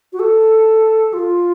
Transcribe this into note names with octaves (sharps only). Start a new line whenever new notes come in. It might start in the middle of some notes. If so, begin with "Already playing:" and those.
F#4
A4
F4